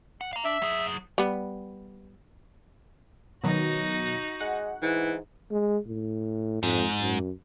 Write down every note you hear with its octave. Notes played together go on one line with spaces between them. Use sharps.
F#5
F5 A#5
D4 E5
F#3 G#4
G3 B3
B2 D#3 F#3 D#4 F#4
G#3 F#5
G#2 E3
G#3
A2
F2 G#2
F#2